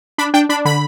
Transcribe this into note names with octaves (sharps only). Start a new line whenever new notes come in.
D4 B5
D4 G5
D4 B5
D3 B5